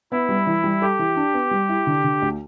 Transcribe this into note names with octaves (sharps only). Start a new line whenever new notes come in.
B3 E4
G3
E3
G3
G4 A4
E3
D4
B3
G3
E4
D3
D3
D2